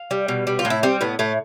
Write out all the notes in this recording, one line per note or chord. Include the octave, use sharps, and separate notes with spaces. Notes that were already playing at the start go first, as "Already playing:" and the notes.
Already playing: F5
G3
B2
G3
F4
A2
E4
G3 C4
A2 B3
A2 A3